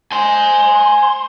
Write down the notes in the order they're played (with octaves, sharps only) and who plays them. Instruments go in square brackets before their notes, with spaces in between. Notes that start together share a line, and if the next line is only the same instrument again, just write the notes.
[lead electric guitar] C5 [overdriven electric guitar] G#5 C6